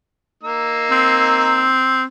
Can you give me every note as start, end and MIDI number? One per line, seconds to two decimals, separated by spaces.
0.43 1.72 58
0.43 1.72 63
0.43 1.72 88
0.91 2.05 60